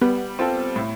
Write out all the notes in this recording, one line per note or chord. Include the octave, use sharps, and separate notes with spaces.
G3 B3
C4 F4 A4
A2